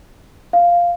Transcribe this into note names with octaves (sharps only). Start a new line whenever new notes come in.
F5